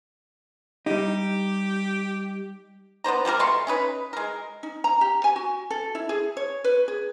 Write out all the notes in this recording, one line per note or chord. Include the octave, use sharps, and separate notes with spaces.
G3 D#4 G4
B3 D4 C5 A#5
F3 G3 A#3 A#4
B2 A3 C6 C#6
C#4 D#4 B4
G#3 A#4
D#4
A#5
G4
G#5
F#4
A4
E4
G#4
C#5
B4
G#4